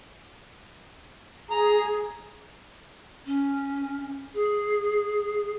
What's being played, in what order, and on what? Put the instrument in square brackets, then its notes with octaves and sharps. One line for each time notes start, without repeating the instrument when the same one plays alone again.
[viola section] G#4 [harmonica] A#5
[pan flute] C#4
G#4